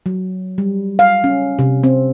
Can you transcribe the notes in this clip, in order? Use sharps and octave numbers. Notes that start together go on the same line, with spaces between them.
F#3
G3
F5
C#4
C3
C4